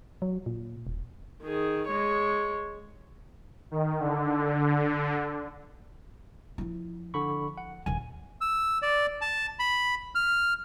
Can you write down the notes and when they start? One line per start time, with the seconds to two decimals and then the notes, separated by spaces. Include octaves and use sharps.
0.22 F#3
0.46 A#2
0.87 D#1
1.43 D#3 G#4
1.88 G#3 C#5
3.71 D#3
4.00 D3
6.58 F3 E4
7.14 D3 B5 C#6
7.58 F#5
7.86 D#1 D#3 G#5
8.41 E6
8.82 D5
9.21 A5
9.59 B5
10.15 F6